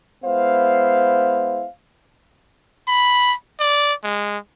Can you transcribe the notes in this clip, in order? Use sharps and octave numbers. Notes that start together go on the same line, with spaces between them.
G#3 B3 E4 C5 F5
B5
D5
G#3